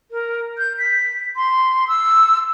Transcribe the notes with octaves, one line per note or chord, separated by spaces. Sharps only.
A#4
G6
B6
C6
E6